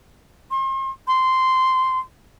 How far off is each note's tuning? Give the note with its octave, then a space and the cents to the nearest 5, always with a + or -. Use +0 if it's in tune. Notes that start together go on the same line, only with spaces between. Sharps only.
C6 +40
C6 -10